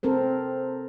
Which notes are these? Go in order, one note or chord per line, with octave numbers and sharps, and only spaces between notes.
C4 A4 A#4 C5